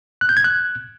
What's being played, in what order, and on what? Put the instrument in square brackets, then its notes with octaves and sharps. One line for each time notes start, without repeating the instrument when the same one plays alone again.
[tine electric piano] F#6
G6
G#6
F#6